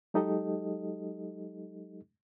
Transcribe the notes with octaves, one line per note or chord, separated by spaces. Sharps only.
F#3 G#3 D#4 G4 A4 D#5